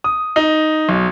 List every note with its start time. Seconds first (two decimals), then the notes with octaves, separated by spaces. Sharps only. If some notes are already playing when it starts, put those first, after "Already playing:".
0.04 D#6
0.36 D#4
0.89 B1